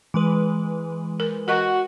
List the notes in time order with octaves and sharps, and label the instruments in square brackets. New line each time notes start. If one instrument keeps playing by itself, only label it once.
[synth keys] E3 G#3 B4
[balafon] A#4
[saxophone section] F#4 [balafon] A#4 D#5 F#5